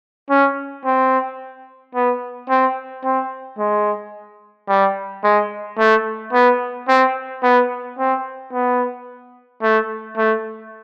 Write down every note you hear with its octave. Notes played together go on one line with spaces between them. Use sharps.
C#4
C4
B3
C4
C4
G#3
G3
G#3
A3
B3
C4
B3
C4
B3
A3
A3